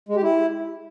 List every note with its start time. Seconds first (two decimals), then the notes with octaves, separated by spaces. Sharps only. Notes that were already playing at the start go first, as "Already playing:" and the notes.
0.09 G#3
0.16 G4
0.23 E4